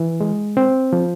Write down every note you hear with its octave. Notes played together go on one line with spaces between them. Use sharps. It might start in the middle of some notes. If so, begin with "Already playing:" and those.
Already playing: E3
G#3
C4
F3